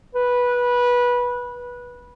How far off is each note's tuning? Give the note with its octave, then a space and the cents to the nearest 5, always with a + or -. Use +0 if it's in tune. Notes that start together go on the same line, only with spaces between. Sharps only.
B4 -15